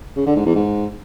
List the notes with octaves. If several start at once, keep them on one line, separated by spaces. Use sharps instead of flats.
C#3
D3
G#2
E2
G#2